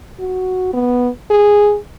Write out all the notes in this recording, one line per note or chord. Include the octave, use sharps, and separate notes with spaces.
F#4
B3
G#4